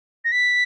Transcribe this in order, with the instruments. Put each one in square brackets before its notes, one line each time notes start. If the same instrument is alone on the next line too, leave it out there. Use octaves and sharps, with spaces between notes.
[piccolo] A#6
B6